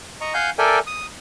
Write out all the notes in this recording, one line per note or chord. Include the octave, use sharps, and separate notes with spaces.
D#5 A#5 C#6
F5 F#5 G#5 G6
A4 A#4 D5 E5 G5 G#5
D#6